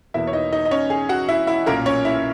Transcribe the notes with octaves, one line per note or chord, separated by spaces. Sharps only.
E2 B2 A#3 E4 E5
C#5
D#4 D#5
D#4 D#5
D#5
C#4 C#5
G#4
F#4 F#5
E4 E5
E4 E5
B1 A#2 A#3 C#4 A#4
C#4 C#5
E4 E5